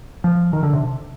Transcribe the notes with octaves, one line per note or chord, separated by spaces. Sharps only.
F3
D#3
D3
C3